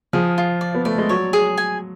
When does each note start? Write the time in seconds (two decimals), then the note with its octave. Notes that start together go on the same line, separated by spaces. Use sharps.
0.13 F3 G#4
0.38 F4
0.61 D5
0.75 B3
0.85 A3 D5
0.98 G#3
1.09 F#3 C#5
1.33 G#4
1.58 G#5